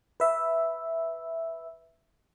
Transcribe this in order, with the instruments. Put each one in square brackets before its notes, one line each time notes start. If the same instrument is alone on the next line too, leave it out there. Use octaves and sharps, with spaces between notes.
[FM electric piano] B4 E5